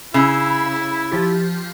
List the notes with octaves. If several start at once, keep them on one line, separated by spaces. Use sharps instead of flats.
C#3 E4 B5 E6
F3 F4 G4